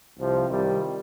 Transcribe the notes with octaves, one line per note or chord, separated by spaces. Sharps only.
C2 C3 F3
C2 C3 D#3 G3